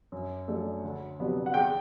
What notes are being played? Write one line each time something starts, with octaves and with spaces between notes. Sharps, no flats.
F#2
F#3 A3 D4
D2
C3 F#3 B3 D4
F#5
E2 G5